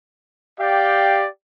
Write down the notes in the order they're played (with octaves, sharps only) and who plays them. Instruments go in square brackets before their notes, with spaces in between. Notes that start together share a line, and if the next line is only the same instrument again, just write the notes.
[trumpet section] G4 D5 F5 G5